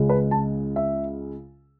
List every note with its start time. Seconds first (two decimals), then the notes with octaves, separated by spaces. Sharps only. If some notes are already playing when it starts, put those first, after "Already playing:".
Already playing: C#2 C#3 G#3
0.09 B4
0.31 A5
0.76 E5